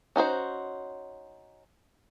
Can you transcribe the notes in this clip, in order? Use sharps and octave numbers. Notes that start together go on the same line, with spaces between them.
C#4 D#4 F#4 C5